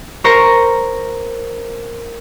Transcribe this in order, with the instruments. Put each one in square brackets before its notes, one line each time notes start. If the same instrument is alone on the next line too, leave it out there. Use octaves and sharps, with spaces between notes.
[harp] A#4 C5 C#6 A#6